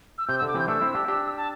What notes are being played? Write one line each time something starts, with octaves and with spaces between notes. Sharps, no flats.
E6
C3 G6
D3 E6
D6
C3 E3 G6
A3 D4 E6
C4 E4
D4 G4
D4 G4
A5